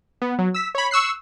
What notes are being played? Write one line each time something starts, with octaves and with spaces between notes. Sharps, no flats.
B3
F#3
E6 B6
C#5 B5
C#6 E6 F#6 C7